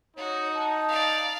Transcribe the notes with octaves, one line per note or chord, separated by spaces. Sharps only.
D#4 F#4 C#5
A5
D5 F5